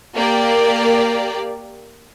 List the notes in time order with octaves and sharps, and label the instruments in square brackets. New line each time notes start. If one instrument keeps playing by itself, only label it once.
[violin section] A#3 G4 D5